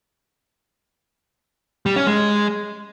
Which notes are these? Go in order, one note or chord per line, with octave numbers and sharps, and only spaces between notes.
G3
C#4
G#3